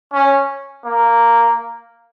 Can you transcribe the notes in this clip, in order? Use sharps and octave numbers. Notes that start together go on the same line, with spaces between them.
C#4
A#3